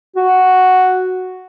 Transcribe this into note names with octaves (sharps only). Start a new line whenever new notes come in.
F#4